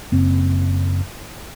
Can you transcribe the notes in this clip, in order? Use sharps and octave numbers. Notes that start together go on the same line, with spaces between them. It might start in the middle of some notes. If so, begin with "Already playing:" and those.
F#1 C4